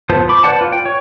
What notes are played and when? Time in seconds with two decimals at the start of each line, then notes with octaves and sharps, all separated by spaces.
0.09 B3 F4 C5 A5
0.29 B5 D6
0.43 B4 C5 D5 F#5 A5
0.61 F4
0.72 G5
0.85 C#5